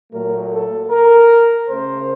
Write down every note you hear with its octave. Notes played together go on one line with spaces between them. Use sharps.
A#2 F#3 A3 A#4
A4
A#4
C#3 A3 C5